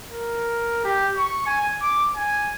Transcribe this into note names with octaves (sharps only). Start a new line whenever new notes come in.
A#4
G4
C#6
G#5
D6
G#5